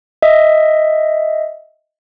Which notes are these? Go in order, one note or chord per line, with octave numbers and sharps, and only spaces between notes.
D#5 E5